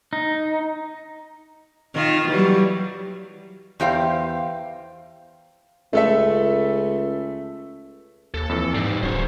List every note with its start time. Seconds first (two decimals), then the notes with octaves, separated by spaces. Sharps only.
0.13 D#4
1.94 D#3 F4
2.28 E3 F#3 G3
3.80 E2 G4 C5 F5
5.93 C#2 A3 A4 E5
8.34 D#2 A4
8.49 F2 E3
8.74 G#2 G3 D#4 C7
9.03 D1 C#3 F#3 C5 C#5